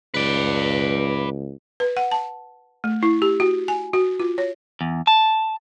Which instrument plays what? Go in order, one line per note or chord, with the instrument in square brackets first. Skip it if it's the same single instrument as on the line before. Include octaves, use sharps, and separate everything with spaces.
[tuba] C#2 [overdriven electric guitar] B4 D5
[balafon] B4
F#5
A5
A3
E4
G4
F#4
G#5
F#4
F4
C#5
[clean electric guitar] E2
A5